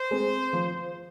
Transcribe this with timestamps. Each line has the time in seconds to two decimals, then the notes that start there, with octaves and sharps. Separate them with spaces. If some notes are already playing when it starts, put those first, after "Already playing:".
Already playing: C5
0.11 G#3 C4
0.53 F3